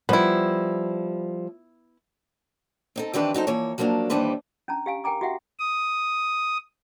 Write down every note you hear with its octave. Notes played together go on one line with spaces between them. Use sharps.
F3 G3 B3 E4
C4 D#4 A4
D#3 E3 C4 D4 G4 B4
F#3 D#4 A4 C5
E3 F3 A#3 C#5
F3 F#3 A#3 C#4 D4
D#2 E3 G3 D4 B4 C5
C#4 D4 A5 A#5
G4 F5 G#5
A#4 G5 G#5 A#5 D6
F#4 G4 E5 F#5 G5
D#6